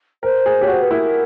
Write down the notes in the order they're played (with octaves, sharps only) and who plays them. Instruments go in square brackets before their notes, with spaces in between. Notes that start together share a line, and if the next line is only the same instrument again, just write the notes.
[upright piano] A#4 [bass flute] C5
[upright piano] G#4
[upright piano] G4 [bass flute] C#5
[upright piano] F#4 [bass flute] C5
[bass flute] B4
[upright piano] E4 [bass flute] A#4